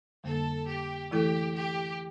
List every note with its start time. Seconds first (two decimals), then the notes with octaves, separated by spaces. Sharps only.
0.24 F2 D3 G3 A#3 A4
0.68 G4
1.11 E3 A3 E4 G4 A4
1.55 G4